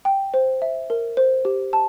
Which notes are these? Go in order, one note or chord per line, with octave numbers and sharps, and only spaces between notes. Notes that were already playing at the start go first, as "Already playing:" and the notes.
G5
C5
E5
A#4
C5
G4
A5